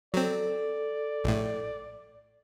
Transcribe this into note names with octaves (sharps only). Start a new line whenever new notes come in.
F#3 C4 A4 D5
A#1 A2